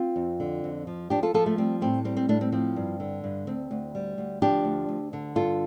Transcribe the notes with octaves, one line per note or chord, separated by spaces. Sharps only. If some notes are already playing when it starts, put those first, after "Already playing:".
Already playing: C4 F4
F2
D3
F2
F3
F3 D4 G4
F4 A4
F3 F4 A4
A3
G3 C4
A2 C4
G3 C4
C4
A2 A3 D4
C4
F3 C4
G2
D3
G2
D2 C4
D2
G3
D2
F3 D4 G4
D2
D2
D3
G2 F4 A4